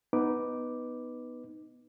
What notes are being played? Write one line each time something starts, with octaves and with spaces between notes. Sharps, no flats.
B3 D#4 B4 D6